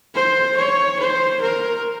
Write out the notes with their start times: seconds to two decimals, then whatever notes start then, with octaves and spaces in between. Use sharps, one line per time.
0.15 C5
0.57 C#5
0.99 C5
1.41 A#4